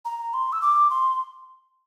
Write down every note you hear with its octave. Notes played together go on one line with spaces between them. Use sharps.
A#5
C6
E6
D6
C6